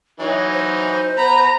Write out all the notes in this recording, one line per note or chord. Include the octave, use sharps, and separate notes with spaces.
E3 F#3 D#4 C#5
C5
B3 A#5 B5